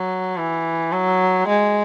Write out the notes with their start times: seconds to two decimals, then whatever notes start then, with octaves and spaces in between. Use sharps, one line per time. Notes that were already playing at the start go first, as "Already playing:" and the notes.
Already playing: F#3
0.37 E3
0.92 F#3
1.48 G#3